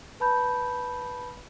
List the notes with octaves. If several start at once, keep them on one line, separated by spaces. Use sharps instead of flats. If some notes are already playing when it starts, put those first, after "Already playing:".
B4 A5 B5 G6